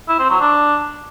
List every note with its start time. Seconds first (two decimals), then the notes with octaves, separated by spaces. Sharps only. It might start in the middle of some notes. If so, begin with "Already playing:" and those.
0.09 E4
0.19 C4
0.30 F#3
0.40 D4